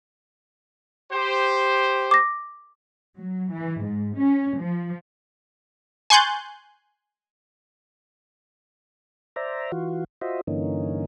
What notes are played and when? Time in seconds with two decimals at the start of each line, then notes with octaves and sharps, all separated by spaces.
1.12 G4 C5
2.11 D6 A#6
3.16 F#3
3.51 E3
3.82 G#2
4.17 C#4
4.59 F3
6.10 G#5 C6 C#6 F#6 G6 A6
9.36 C5 D5 E5 A#5
9.72 E3 F4 F#4
10.21 F4 F#4 C5 D#5 E5
10.47 G2 D3 E3 A#3 C#4 D#4